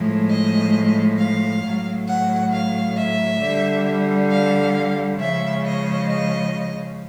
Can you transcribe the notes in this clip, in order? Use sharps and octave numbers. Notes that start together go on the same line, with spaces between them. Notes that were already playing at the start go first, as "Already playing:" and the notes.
Already playing: A2 F3 G#3
D#5
F5
A2 F#3
F#5
F5
E5
D3
G3
F5
C#3 F3 G#3 E5
D#5
D#5